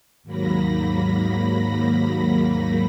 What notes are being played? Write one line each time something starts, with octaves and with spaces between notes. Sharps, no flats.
D#2 G#2 F#3 A#3 B5 A#6